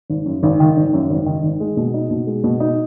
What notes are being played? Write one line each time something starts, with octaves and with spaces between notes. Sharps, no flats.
G#1
F#2
G#1
D#3
G#1
F#2
G#1
D#3
G#1
G#3
B2
D#4
B2
G#3
B2
D#4